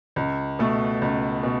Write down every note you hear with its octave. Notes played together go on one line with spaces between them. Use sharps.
C#2
B2 A3
C#2
B2